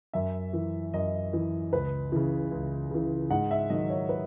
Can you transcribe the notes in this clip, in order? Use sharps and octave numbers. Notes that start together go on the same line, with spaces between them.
F#2 E5
E3
F#2 D#5
E3
C#2 B4
C#3 E3
C#2
C#3 E3
G#2 F#5
E5
D#3 F#3 D#5
C#5
B4